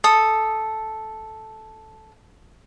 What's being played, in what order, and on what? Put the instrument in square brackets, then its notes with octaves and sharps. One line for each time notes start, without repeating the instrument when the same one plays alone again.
[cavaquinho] A4 D#6